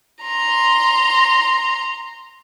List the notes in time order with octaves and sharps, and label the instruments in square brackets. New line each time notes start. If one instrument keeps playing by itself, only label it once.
[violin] A#5 C6